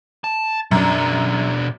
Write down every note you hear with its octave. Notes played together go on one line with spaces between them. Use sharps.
A5
F#2 B2 D4